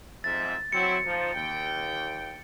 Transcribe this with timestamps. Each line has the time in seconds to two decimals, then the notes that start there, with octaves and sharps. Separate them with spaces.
0.24 F2 G#2 E5 A6
0.73 F#3 C4 E4 C#7
1.05 F3 D#4
1.35 D#2 G5